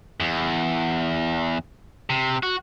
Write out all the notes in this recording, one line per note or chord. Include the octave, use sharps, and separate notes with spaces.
E2
C3
F#4